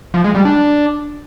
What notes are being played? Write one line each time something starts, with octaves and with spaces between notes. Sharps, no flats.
F3
G#3
G3
D4